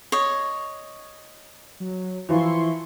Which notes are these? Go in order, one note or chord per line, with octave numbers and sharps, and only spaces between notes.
C#5 D#5
F#3
E3 F3 E4 C6 C#6